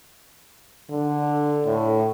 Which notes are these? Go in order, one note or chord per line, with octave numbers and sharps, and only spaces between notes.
D3
A2